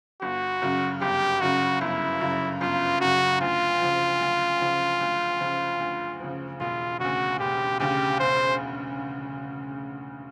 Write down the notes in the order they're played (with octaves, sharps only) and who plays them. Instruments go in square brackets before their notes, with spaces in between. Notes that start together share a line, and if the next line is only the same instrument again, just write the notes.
[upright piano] G1 [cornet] F#4
[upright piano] F#2 C#3
[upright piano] G1 [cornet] G4
[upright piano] F#2 C#3 [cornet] F#4
[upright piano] G1 [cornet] E4
[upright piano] F#2 C#3
[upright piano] G1 [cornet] F4
[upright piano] F#2 C#3 [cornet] F#4
[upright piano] D2 [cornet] F4
[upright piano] C#3 F3
D2
C#3 F3
D2
C#3 F3
D2
C#3 F3
[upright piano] E1 [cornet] F4
[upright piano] D2 C#3 [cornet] F#4
[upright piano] E1 [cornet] G4
[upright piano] D2 C#3 [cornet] G4
[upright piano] E1 [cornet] C5